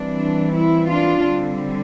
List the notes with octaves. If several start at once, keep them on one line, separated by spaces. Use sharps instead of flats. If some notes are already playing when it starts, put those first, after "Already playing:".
Already playing: E3 G3 C4 D4
E4
D4 F4
D3 G3 C4